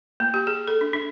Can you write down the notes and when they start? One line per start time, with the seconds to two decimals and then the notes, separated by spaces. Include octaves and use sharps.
0.20 A#3
0.34 G4
0.47 G#4
0.68 A4
0.81 D4
0.93 D4